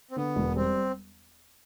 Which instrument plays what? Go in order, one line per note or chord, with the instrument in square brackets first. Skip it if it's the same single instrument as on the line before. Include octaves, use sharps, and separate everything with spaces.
[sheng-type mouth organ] C4
[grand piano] D3 [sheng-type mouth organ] B3
[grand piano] E1
[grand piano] G3 [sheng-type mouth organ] C4